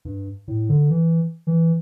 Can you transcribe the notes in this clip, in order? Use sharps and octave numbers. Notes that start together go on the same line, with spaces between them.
G2
A2
D3
E3
E3